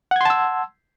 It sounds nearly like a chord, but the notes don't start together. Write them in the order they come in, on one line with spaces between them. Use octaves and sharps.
F#5 G#6 C6 A5 E6